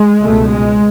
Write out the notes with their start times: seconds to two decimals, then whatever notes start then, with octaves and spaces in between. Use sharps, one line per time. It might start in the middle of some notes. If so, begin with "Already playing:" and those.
Already playing: G#3
0.20 C#2 B2 A3
0.50 G#3